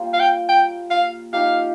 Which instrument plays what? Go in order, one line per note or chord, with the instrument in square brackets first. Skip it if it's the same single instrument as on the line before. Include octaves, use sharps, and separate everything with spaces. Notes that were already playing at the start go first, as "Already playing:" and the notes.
Already playing: [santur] G3 A#3 F4 C5
[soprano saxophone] F5
G5
G5
F5
[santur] F3 D#4 G4 [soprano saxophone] F5